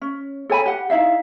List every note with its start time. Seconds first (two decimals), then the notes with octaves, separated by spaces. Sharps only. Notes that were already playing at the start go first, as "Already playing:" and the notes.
0.02 C#4
0.49 A4 C#5 G#5 B5
0.66 G4 F#5
0.90 D#4 E4 E5 F5